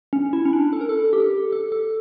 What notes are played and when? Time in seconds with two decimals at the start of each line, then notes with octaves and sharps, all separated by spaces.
0.13 C#4
0.33 E4
0.45 C#4
0.53 D4
0.73 A4
0.81 A#4
0.89 A4
1.13 G4
1.52 A4
1.72 A4